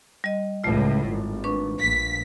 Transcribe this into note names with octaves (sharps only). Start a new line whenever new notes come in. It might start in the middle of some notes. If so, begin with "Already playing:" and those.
G3 D#5
C#2 A2 A3 F4
G#1
D4 B4 C#6
A#1 B6